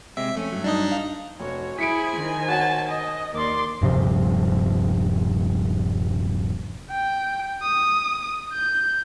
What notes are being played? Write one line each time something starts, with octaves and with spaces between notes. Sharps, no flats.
C3 G#3 C4 E5
F2 A3 C#4
G2 F#3
D4 D#4 D#5
F5
F1 F#4 C#5
E4 G#4 C5 G#5 B5 B6 C#7 D7
D#3
F#4 C#5 F#5 A5
D#5
D#2 D#3 D5 C6 D6
D#1 G2 C3 F3
G5
D#6
G6